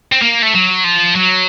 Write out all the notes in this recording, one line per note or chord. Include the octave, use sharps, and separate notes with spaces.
C4
A#3
A3
F#3
F3
F#3